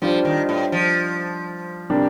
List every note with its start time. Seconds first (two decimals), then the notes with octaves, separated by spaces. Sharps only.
0.02 F3 G3 D4 F4 C5
0.25 D#3
0.49 A2
0.72 F3
1.90 C3 G3 D4 G4 A#4